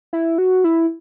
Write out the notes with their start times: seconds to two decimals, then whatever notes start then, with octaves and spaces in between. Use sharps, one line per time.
0.13 E4
0.38 F#4
0.64 E4